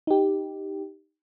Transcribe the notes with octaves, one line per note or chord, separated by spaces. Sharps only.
D#4 G4